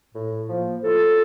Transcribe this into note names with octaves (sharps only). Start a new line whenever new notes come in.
A2
F3 A#3
A2 F4 A4